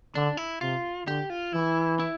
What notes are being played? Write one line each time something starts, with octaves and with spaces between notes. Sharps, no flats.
D3 D4
E4
C3 F4
D3 G4
F4
E3 E4
E4